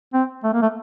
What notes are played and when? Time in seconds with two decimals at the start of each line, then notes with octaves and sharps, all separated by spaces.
0.14 C4
0.44 A3
0.53 A#3
0.62 A3